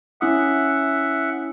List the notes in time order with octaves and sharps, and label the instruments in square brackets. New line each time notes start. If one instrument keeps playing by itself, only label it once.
[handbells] C#4 E4 D#6 [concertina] E5 F#5